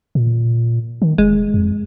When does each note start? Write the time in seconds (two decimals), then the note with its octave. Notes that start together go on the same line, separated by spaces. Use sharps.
0.15 A#2
1.02 D#3
1.18 F1 G#3
1.54 F2